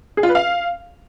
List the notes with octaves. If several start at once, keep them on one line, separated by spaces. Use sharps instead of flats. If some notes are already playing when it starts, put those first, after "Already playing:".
G#4
F4
B4
F5